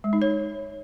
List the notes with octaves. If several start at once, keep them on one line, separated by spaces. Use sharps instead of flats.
G#3
D#4
C#5